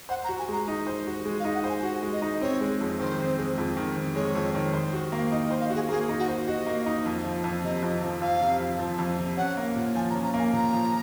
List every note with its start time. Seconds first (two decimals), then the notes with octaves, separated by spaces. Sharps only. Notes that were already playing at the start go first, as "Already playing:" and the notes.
0.09 C5 F#5
0.24 A#5
0.29 F#4
0.39 G#5
0.48 G#3 A#5
0.68 D#4
0.87 C5
1.07 F#4
1.26 G#3
1.40 F5
1.45 D#4
1.54 F#5
1.64 C5
1.69 G#5
1.83 F#4 F#5
2.03 G#3
2.12 D#5
2.22 D#4
2.41 C4 C#5
2.61 G#3
2.80 F2
2.99 D#3 C5
3.19 C4
3.39 G#3
3.58 F2
3.77 D#3
3.96 C4
4.15 G#3 C#5
4.35 F2
4.54 D#3
4.74 C5
4.93 F#4
5.12 A#3
5.31 D#4 D#5
5.46 D#5
5.51 C5
5.60 F5
5.70 F#4 G#4
5.89 A#3 G#4
6.09 D#4
6.18 F#4
6.29 C5
6.47 F#4 D#5
6.66 A#3
6.86 D#4
7.05 F2
7.24 F3
7.44 F2
7.63 C3 D#5
7.83 F2
8.02 F3
8.21 F2 F5
8.41 C3
8.60 F2
8.79 F3
8.98 F2
9.18 C3
9.37 C#4 F#5
9.57 A#3
9.76 A#2
9.95 F3 G#5
10.10 A#5
10.15 C#4
10.24 A#5
10.34 A#3
10.39 G#5
10.53 A#2 A#5
10.73 F3